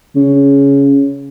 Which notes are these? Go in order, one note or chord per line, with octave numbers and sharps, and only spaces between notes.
C#3